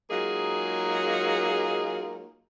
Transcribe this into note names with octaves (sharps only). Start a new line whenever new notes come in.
F#3 G#3 A#3 D#4 F4 G#4